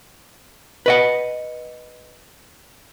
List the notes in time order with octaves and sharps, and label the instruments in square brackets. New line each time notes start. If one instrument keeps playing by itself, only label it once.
[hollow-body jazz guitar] B4 D#5 F#5